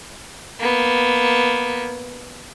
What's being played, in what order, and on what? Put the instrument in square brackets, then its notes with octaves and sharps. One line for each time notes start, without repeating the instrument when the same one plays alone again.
[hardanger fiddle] A#3 B3